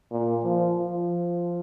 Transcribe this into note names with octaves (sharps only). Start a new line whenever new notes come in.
A#2
F3
F3